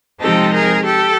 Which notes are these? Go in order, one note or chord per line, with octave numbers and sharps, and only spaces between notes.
C3 F3 G#3 C4 D#4 G4 A4
G#4 A#4
G4 A4